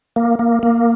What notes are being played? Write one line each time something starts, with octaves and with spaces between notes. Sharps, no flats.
A#3
A#3
A#3